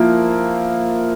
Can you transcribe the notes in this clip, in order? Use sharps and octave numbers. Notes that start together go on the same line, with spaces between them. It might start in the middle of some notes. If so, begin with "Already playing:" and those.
Already playing: F3 A#3 E4